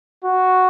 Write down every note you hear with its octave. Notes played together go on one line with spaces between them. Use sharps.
F#4